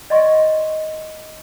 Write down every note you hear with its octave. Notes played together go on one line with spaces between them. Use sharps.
D5 D#5 F#5 C6 C#6